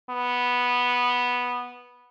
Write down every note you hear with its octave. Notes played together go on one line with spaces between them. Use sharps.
B3